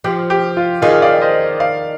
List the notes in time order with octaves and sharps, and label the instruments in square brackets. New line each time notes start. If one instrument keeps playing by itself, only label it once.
[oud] F3 [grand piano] G4
[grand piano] G4
F4
[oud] D#3 [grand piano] F4 G#4
[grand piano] D5 F5
C5 D#5
D5 F5